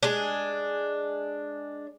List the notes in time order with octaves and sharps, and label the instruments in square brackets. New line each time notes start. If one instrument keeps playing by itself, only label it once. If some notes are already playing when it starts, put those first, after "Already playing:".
[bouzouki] G#3 D4